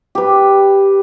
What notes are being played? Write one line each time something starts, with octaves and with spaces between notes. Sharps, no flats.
G4 B4